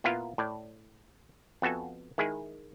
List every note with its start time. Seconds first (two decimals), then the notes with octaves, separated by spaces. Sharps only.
0.04 A#2 B3 E4 F4 A#4 F5
0.38 A2 D5
1.62 F2 B3 F#4 A4 G#5
2.18 D#3 G#3 E4 G#4